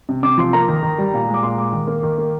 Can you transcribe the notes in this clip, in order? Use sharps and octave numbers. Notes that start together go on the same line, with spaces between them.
C3
C3 D6
F3 C6
A#3 A#5
D#3
D#3
G3
A#2
G#3
D6
A#2 C6
G#3 D6
D#3
A#3
D#3
A#3